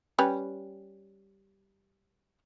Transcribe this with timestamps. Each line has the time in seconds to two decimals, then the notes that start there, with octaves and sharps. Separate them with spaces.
0.18 G3 C#4 B4